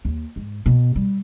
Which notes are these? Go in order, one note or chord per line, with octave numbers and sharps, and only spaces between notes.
D#2
G#2
B2
G3